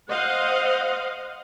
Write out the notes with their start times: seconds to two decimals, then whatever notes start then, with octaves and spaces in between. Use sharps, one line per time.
0.10 C5 D#5 F5 F#5